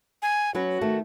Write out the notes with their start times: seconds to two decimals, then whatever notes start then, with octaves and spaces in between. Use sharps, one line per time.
0.22 G#5
0.55 F#3 C#4 F#4 B4
0.81 D#3 A3